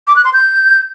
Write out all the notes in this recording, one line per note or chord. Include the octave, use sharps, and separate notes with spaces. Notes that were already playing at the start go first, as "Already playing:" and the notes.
D6
F#6
C6
G6